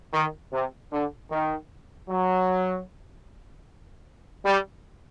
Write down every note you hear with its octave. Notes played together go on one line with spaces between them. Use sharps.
D#3
C3
D3
D#3
F#3
G3